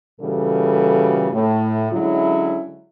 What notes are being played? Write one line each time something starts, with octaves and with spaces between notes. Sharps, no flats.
A#2 C#3 E3 G3 F#4 A4
A2
D3 F#3 G#3 C#4 E4